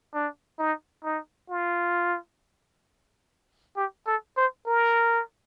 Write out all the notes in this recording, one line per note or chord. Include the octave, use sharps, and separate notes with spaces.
D4
D#4
D#4
F4
G4
A4
C5
A#4